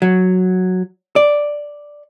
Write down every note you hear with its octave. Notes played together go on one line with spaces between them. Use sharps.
F#3
D5